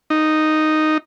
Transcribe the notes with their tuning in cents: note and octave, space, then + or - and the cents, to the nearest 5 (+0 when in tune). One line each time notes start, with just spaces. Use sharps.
D#4 -5